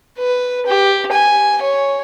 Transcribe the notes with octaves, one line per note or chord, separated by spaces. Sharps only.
B4
G4
G#5
C#5